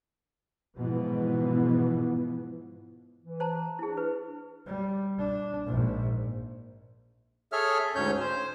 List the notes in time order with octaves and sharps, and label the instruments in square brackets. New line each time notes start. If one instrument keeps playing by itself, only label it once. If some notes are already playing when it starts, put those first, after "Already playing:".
[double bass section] G#2 B2 E3 F3 B3
[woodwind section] E3
[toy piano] C5 A5 A#5
[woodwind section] D4 [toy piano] E4 G#4
[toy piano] B4
[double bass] G3
D4
A#1 G#2
[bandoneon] G#4 A4 C#5 E5 F6
D2 G#2 C#4 C#5 G6
C5